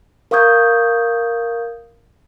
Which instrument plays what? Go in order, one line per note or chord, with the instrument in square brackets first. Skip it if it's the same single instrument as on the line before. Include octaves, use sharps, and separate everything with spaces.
[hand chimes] A#4 F5 C#6 D#6 G6 G#6